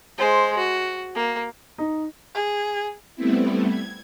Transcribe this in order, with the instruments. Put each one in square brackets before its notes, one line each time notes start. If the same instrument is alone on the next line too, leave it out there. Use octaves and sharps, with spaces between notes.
[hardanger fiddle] G#3 C5
F#4
A#3
[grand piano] D#4
[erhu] G#4
[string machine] G3 A3 B3 C4 E4
G#6